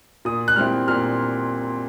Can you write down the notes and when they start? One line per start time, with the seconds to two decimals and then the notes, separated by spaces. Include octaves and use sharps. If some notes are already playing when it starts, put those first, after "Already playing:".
0.25 A#2 D#6
0.48 F#6
0.56 G3 C4 E4 F6
0.88 A#2 F6